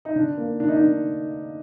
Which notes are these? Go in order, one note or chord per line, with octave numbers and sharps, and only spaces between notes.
D#4
D3 D4
A#3
D3 D4
D#4
D4
D3